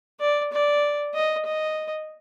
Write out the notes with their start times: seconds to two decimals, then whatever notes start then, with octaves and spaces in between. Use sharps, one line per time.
0.20 D5
0.53 D5
1.14 D#5
1.46 D#5